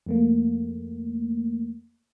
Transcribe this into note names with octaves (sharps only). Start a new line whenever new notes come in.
F2 A3 A#3